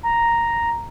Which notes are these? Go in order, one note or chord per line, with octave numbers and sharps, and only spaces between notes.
A#5